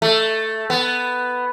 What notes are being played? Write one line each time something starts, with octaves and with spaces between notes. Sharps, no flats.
A3
B3